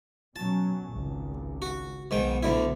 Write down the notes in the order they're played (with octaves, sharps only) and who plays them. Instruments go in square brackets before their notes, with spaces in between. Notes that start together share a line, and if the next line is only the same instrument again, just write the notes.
[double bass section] B2 F#3 C#4 [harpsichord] A5
[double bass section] G#1 C#2
[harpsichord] F#4
[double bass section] B1 B2 B3 [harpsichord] G#2 D#3 G5
[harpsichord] D2 D3 E4